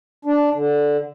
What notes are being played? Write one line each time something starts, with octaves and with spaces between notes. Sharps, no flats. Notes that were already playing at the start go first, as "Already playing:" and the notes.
D4
D3